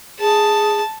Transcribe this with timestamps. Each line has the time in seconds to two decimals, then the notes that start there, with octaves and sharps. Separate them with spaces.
0.20 G#4 A5